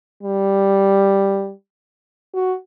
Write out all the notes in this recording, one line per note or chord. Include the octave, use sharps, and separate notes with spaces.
G3
F#4